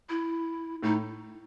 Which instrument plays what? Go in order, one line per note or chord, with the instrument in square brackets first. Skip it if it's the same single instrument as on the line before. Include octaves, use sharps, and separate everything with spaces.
[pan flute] E4
[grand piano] A2 [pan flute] D#4